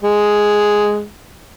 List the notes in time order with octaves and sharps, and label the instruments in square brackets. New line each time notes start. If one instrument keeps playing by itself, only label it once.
[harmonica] G#3